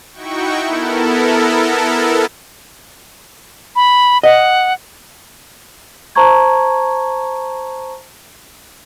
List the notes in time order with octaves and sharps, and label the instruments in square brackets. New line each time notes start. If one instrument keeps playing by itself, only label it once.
[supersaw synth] D#4 E4 F#4 G5 C#6
B3 E4 A4 A#4
[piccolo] B5
[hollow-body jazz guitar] D#5 [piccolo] F#5
[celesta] C5 A5 A#5 C#6 G#6